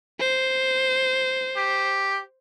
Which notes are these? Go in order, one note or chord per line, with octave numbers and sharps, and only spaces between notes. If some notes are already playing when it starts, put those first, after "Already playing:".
C5
G4